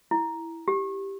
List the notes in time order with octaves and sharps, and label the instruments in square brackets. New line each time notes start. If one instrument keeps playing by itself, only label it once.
[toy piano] E4
G4